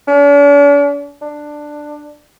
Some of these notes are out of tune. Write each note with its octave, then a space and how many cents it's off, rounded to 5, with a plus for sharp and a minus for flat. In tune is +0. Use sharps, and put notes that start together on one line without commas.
D4 -45
D4 +10